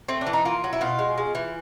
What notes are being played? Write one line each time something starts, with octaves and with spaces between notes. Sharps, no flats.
A3 C4
D4
E3
D#4
A#3 F4
F#3
E4
B2 F4
G#3
G#3
E3